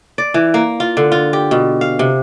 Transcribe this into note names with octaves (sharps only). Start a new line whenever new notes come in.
D5
E3
A#3
F4
D3
F4
G4
B2
F5
C3